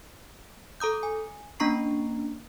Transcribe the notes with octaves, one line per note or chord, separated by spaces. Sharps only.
A4 A#5 D#6 G6
G#5
A#3 C#4 D4 A#5 C#6 C7